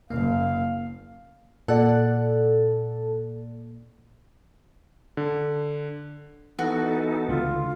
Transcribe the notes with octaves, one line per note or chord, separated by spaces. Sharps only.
F#1 A#3 F5
A#2 A4 D5 F#5
D3
E3 B3 D#4 F#4 A4
C#2 D3 F4